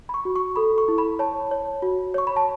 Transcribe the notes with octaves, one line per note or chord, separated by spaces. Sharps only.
B5
C#6
F#4
C#6
A4 B5
C#6
E4
B5
C#5 A5
C#5
F#4
C#5 C#6
B5
A5